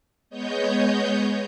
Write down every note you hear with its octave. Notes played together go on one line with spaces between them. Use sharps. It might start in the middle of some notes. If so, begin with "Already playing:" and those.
G#3 B3 C#5 D#5 G6